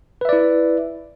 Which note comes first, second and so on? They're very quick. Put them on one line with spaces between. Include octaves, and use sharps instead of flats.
B4 E5 D5 E4